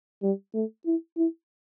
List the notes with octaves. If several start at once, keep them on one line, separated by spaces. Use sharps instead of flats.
G3
A3
E4
E4